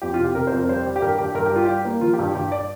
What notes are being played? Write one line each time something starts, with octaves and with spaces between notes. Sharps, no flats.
F2 G4
F4
C3
G4
C3 A#4
C5
F2
A#4
G3 C5
G3
G4
G2 A#4
G2 G4
G2 A#4
G4
G3 F4
G3 G4
A#3
F3 F4
G4
G2
G4
G2 G4
D5